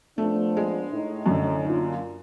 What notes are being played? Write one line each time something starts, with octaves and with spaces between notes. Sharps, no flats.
F3 A3 B3 D4
G#3
A2 D#4
F#2 D3
A#3 D4 F4